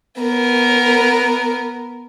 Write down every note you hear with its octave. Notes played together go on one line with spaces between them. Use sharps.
B3 A#4